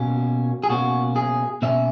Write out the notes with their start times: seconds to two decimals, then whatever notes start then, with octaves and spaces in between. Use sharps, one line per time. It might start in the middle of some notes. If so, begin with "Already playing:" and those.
Already playing: B2 A#3 C#4
0.64 G#4
0.69 B2 A#3 C#4 F#4
1.16 G#4
1.62 B2 A#3 C#4 E5